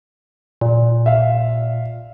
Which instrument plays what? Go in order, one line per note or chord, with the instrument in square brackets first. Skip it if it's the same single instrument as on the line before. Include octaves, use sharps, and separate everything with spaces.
[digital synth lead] A#2
[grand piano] E5 F5